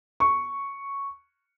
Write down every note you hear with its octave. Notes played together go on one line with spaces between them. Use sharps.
C#6